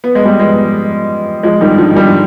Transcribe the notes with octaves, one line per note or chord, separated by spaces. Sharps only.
B3
G#3
G3 B3
F3 G#3
F3 G#3
D#3 G3
D3 F3
D#3 G3